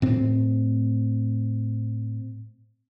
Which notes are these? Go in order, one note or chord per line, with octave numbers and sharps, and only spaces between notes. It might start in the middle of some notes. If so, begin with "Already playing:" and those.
A2 C4